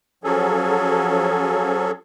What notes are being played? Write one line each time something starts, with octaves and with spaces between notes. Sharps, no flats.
F3 F#3 C#4 G#4 A4